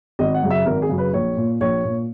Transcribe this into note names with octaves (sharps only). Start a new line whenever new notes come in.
G#1 D#5
F#5
F#2 C#3
E5
G#1 A#4
G#4
F#2 C#3
B4
A#1 C#5
A#2
A#1 C#5
A#2